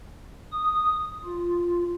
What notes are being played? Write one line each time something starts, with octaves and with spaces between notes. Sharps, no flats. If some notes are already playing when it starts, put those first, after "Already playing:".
D#6
F4